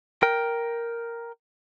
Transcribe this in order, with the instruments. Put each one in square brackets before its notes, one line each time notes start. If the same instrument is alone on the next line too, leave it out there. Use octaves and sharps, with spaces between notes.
[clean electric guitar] A#4 G5